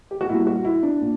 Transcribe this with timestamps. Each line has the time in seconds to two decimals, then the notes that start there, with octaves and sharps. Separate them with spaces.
0.11 G4
0.21 F#4
0.28 A#2 G3 E4
0.47 F#4
0.65 E4
0.83 D4
1.01 A#2